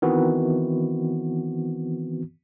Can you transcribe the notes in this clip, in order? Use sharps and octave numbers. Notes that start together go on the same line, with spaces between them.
D#3 E3 B3 C4 F#4